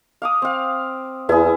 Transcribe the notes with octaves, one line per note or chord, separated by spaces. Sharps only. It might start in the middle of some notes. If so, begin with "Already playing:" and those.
F5 D6 D#6
C4 F5
E2 E4 G#4